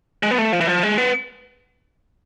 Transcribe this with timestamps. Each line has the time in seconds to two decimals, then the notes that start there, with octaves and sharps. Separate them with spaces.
0.23 G#3
0.31 B3
0.38 A3
0.52 F3
0.61 E3
0.68 F3
0.83 G#3
0.98 B3